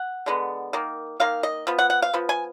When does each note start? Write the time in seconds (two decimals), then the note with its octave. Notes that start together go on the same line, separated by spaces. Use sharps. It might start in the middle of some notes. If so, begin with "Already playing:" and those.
Already playing: F#5
0.26 D3 G#3 B3
0.73 D#3 A#3
1.20 D#3 A#3 F5
1.43 D#5
1.67 F3 B3
1.78 F#5
1.90 F#5
2.02 F5
2.14 F3 B3
2.29 G#5